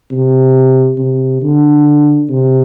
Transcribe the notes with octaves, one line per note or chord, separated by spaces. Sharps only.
C3
C3
D3
C3